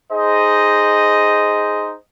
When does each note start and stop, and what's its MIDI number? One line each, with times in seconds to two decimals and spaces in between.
0.12 1.95 63
0.12 1.95 68
0.12 1.95 72
0.12 1.95 75